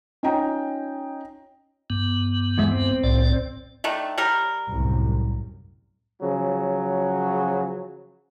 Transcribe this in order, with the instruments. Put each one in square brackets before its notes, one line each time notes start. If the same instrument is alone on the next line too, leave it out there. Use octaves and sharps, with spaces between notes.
[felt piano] C#4 D#4 F4 D#5 G5 A#5
[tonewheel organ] G2 B3
[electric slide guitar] E2 G#3 E5
C4
[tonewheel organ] C2 A2 D5
[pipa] D#3 A3 D4
G3 A#4
[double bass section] C2 F#2 A2
[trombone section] C#3 F3 F#3